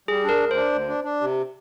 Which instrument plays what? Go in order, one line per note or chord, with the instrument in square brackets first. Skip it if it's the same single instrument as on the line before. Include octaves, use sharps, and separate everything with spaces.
[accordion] G3 [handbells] G#4
[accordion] D4
[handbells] A#4
[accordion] D2
[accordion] D4 [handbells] C5
[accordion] D2
D4
D4
C3